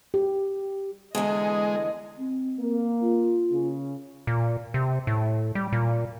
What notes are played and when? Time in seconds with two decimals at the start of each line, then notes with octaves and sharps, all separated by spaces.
0.14 G4
1.15 E2 D3 G#3 D#5
2.18 C4
2.60 A#3
3.02 F4
3.53 C#3
4.27 A#2
4.74 C3
5.07 A2
5.55 G3
5.72 A#2